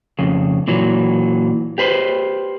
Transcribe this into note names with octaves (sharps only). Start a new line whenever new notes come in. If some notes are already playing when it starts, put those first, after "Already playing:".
F2 C#3
A#2 E3 F#3
G4 B4 C5